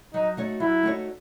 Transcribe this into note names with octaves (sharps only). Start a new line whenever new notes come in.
F#3 D#4
A3 D#4 F#4 C#5
F#3 E4
A3 D#4 F#4 C#5